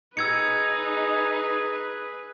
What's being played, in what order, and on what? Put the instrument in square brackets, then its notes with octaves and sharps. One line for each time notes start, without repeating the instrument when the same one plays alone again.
[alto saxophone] D#4 [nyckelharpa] G#4 [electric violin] B4 [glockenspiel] E6 G#6 C#7